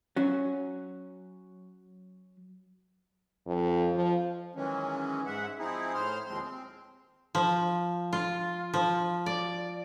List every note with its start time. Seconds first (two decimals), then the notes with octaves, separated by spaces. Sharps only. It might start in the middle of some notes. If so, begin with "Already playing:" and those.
0.16 F#3 C#4
3.46 F2
3.95 F3
4.55 D#3 E3 F#3 G#3 C#4
5.26 G#2 G#3 E5 F#5
5.59 F3 C4 D#4 E4 G#4
5.94 A2 C5 C6 F6
6.27 D#2 F3 G#3 C4 C6
6.41 C4
7.35 F3
8.13 F4
8.74 F3
9.26 D5